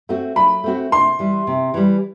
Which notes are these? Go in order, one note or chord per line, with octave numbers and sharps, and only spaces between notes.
A3 C4 F#4
F#3 B5
A3 C4 F#4
C3 C6
E3 G3
C3
E3 G3